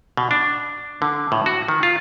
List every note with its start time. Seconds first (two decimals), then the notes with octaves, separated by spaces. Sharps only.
0.17 B2
0.31 D4
1.02 D3
1.32 A2
1.46 F#4
1.68 D#3
1.83 F4